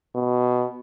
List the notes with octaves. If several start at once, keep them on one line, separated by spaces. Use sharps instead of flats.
B2